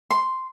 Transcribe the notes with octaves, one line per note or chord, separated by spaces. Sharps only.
C6